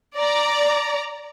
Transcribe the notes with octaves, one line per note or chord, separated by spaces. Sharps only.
D5 A#5